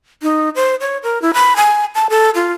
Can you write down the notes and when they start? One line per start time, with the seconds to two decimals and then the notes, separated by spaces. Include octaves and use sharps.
0.23 D#4
0.56 C5
0.81 C#5
1.03 A#4
1.22 E4
1.34 B5
1.56 G#5
1.95 A5
2.10 A4
2.35 F4